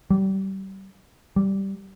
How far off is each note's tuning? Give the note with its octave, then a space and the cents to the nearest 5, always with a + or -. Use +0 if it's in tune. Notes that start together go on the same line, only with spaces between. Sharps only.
G3 -30
G3 -5